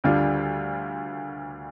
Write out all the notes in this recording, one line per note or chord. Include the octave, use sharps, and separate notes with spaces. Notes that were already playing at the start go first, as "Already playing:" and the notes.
D2 D3 G3 D4 F4